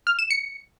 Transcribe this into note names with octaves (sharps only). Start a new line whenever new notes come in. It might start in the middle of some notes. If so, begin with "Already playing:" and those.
F6
E7
C#7